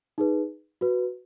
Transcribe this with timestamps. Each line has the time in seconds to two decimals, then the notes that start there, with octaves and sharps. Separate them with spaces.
0.18 D#4 G#4 B4
0.81 F#4 B4